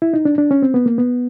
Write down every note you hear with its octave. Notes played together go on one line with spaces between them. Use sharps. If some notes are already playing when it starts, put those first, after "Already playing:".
E4
D#4
D4
D4
C#4
C4
B3
A#3
B3